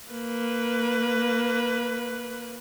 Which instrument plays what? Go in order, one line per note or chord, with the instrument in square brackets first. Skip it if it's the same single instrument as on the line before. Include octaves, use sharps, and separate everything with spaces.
[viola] A#3 B4